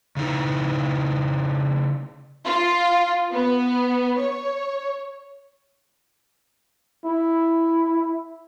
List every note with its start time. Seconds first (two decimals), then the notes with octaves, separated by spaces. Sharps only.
0.16 C#3 D#4 E4
2.45 F4
3.33 B3
4.18 C#5
7.05 E4